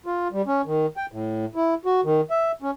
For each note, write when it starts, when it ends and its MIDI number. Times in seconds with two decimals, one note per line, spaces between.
0.06 0.28 65
0.32 0.42 55
0.47 0.62 61
0.66 0.86 51
0.97 1.06 79
1.12 1.45 45
1.55 1.74 64
1.85 2.01 66
2.04 2.21 51
2.30 2.52 76
2.62 2.71 61